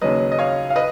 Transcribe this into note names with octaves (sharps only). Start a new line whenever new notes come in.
D#2 C#3 F#3 B4 D#5
D#5
C#5 F5
F5
B4 D#5